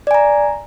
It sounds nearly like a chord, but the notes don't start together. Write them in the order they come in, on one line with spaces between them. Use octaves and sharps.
D5 G#5 A#5